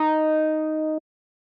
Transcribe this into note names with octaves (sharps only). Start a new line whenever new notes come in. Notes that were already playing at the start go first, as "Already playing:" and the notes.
Already playing: D#4